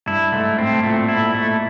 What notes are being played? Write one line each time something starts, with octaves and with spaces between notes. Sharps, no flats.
G2 E4
G#2 A3
A2 C4
A2
A#2 A3
E4
A3